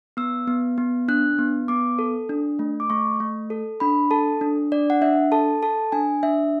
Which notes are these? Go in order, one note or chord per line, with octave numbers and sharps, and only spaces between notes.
B3 E6
B3
B3
D4 F#6
B3
B3 D6
A4
D4
A3
D6
A3 C#6
A3
A4
D4 B5
A4 A5
D4
D4 D5
F#5
D4 E5
A4 A5
A4 A5
D4 G#5
D4 E5